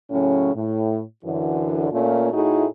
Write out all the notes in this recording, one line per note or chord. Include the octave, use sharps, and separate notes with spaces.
A2 C#3 F#3 C#4
A2
F#2 D3 E3
A#2 A3 A#3 C#4 F4
A2 A3 D#4 E4 F#4 G#4